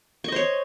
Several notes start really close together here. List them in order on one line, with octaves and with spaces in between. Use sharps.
C#6 D#5 C5 C#5